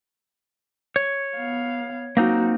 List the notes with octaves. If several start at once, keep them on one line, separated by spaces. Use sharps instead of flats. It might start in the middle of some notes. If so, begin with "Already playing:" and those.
C#5
B3 F5
F#3 A#3 C4 D#4 F#4